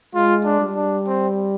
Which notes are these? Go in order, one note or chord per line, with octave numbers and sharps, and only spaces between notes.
G#3 F4
D4
G3
D4
C4